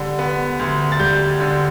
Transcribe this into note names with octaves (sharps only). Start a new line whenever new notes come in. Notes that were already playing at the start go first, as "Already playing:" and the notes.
Already playing: D3 G3
B3
D2
A6
G3 G6
D3